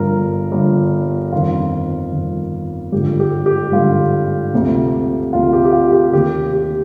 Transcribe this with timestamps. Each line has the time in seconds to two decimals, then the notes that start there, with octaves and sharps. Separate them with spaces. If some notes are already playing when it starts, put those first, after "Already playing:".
Already playing: G1 G2 D3 F3 A#4
0.52 G1 G2 D3 F3
1.32 G1 F2 D#3 F4
2.12 G1 F2 D#3
2.92 G#1 G2 D3 F3 G4
3.20 G4
3.46 G4
3.72 G#1 G2 D3 F3 F4
4.53 D2 C3 F3
5.33 D2 C3 F3 F4
5.53 G4
5.65 G4
5.73 F4
5.93 G4
6.12 D#2 D#3 G4
6.53 G4